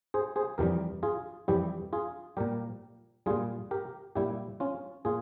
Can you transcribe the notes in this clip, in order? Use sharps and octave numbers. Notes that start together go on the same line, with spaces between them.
G#4 C5
G#4 C5
F2 E3 G3 G4 A#4
F4 G#4
F2 E3 G3 E4 G4
F4 G#4
A#2 G3 G4 A#4
A#2 G3 F4 G#4
G4 A#4
A#2 G3 E4 G4
C#4 F4
A#2 F4 G#4